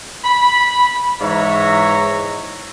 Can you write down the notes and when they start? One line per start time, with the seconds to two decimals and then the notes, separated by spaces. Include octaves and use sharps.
0.25 B5
1.22 G#2 E3 C#5 E5 A#5